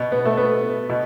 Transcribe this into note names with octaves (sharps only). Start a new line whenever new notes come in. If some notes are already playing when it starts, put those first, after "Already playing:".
Already playing: B2
B3
A3
B3
B2